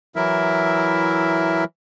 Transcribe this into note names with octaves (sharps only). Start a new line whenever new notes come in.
E3 F#3 E4 A#4 E5